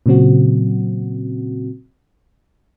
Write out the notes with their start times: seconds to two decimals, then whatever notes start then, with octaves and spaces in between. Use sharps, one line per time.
0.06 A#2 C#3 F#3 C4 F#4